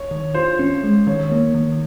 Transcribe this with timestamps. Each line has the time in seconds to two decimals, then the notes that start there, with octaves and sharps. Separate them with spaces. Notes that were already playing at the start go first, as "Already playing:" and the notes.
Already playing: C#5
0.11 D#3
0.34 F4 C5
0.59 C#4
0.84 G#3
1.07 D#3 C#5
1.31 A#3
1.55 D#3